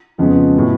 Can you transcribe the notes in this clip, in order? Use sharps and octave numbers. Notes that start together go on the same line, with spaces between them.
F2 C#3 F3 G#3 B3
A2 F#3 B3